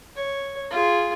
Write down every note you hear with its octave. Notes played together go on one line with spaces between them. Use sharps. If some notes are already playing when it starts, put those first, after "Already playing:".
C#5
F4 G#4